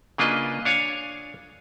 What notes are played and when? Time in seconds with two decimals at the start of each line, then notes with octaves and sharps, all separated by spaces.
0.18 C#3 A#3 D4 F4 B4 D#5
0.65 D4 C#5 F5 G#5